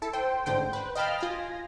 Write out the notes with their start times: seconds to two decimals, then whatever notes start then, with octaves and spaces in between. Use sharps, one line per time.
0.02 E4 A4
0.13 C5 G5
0.46 A1 G#2 D3 C5 G5
0.73 B4 C5
0.95 D#5 F5 G5 A5 B5 F6
1.18 F4 G#5 A#6